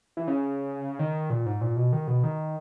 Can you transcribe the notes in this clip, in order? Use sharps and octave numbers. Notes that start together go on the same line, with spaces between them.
E3
C#3
D#3
A#2
G#2
A#2
B2
D#3
B2
D#3